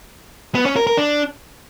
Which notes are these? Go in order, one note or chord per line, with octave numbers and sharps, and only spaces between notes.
B3
C#4
A#4
A#4
D4